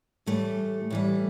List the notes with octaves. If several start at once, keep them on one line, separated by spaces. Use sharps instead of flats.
A2 E3 G3 A3
A2 E3 G3